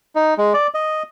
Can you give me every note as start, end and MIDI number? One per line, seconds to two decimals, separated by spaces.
0.15 0.34 63
0.38 0.53 56
0.54 0.67 74
0.74 1.03 75